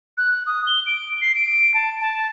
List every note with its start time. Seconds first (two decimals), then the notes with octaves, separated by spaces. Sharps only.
0.18 F#6
0.46 D#6
0.67 G7
0.86 D7
1.22 C7
1.35 D7
1.74 A5
2.00 A5